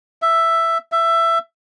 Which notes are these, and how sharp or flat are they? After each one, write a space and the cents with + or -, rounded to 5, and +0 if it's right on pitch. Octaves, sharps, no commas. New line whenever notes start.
E5 +5
E5 +15